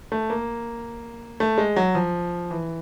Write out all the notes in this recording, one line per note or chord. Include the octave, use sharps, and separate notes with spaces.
A3
A#3
A3
G#3
F#3
F3
E3